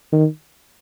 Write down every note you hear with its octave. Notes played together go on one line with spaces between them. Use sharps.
D#3